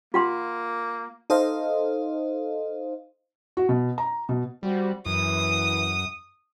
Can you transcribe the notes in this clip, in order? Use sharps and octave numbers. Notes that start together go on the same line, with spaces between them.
A#3 F4 F#5 C6
D#4 A4 C5 D#5 F5
F#4
B2
A#5
B2
G3 C4 F#4 G4
F#2 E3 D#6